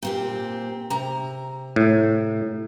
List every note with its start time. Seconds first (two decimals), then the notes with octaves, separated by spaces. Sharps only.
0.03 A#2 C4 G4
0.90 C3 A#5
1.76 A2